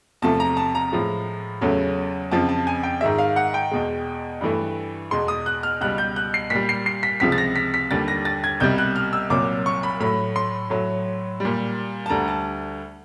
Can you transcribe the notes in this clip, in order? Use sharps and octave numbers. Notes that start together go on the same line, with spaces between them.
E2 C3 F3 A3 A5
A#5
A5
A#5
A2 F3 G#3
E2 C#3 F#3 A3
F2 C#3 F3 A5
A5
G#5
G5
G#2 D#3 G#3 E5
F5
F#5
G5
E2 B2 G#3
G2 E3 A3
E2 B2 G#3 C6
D#6
F#6
F6
C#2 B2 G3 F#6
G6
F#6
C7
A#2 G3 B6
C7
C7
B6
C#2 C3 F3 G#3 B6
A6
A#6
B6
B6
D#2 D3 G3 A6
A#6
A6
G#6
C2 B2 G3 G6
F#6
F6
E6
C2 A#2 F#3 D6
C#6
B5
A2 F#3 A3 B5
C6
A2 F#3 A3
A#2 G3
A5
D2 D3 G3 A#5
A5